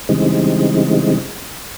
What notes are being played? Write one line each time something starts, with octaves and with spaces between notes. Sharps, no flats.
C#3 E3 G3 G#3 C4 D#4